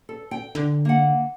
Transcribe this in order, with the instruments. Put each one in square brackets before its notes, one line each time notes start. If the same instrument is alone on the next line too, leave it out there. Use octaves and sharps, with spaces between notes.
[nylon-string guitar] A4
G5
[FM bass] D3
[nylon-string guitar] A#3 F#5